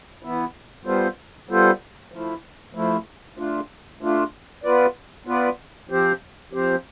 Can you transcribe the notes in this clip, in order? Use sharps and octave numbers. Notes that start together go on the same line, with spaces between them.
E3 B3 E4
G3 B3 F4 A4 C5
G3 B3 F4 A4 C5
F3 A3 E4
F3 A3 E4
A3 D4 F4
A3 D4 F4
B3 F4 B4 D5
B3 F4 B4 D5
F3 C4 G4 C5
F3 C4 G4 C5